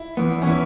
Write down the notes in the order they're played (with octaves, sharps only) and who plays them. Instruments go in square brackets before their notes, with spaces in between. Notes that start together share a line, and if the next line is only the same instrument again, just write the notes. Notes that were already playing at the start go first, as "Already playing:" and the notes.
Already playing: [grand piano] E4
[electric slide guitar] E2 E3 B3
[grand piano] C#4
[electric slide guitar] E3 B3 [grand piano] E4